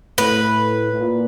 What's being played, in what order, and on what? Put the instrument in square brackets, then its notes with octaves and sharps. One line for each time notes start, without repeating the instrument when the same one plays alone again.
[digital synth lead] A2 [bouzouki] B4
[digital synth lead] A2
A#2